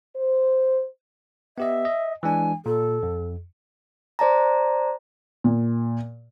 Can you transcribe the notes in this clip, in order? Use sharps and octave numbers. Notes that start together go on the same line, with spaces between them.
C5
B3 G4 D#5 E5
D#5
E3 G#3 D4 G#5
A#2 A4
F2
C5 D5 A5 A#5
A#2